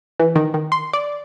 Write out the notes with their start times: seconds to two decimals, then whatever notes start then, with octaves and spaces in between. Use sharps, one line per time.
0.20 E3
0.36 D#3
0.54 D#3
0.72 C6
0.93 D5